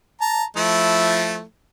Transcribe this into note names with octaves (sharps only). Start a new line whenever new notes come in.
A5 A#5
F3 A3 E4